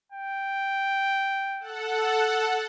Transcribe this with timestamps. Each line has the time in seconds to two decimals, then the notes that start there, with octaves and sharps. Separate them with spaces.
0.12 G5
1.60 A4 F#5